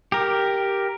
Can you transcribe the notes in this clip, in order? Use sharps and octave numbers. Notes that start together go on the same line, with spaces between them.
G4 A#4